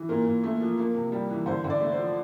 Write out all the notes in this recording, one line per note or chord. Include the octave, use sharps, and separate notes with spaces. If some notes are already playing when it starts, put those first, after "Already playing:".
Already playing: E3
A#2 A#4
A#2
A3
F3
A#3
C3
G3
E3
D3 C5
D3
D5
A3
C5
F3